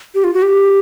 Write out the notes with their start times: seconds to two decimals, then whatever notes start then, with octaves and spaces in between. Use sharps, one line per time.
0.15 G4
0.24 F4
0.34 F#4
0.42 G4